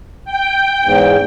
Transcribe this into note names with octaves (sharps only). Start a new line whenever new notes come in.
G5
E2 G#2